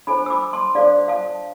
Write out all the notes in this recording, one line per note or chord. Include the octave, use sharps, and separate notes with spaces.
D4 A4 C5 G#5 B5
E6
B5 D6
A5 C6
D4 A4 C5 D5 F5
F5 A5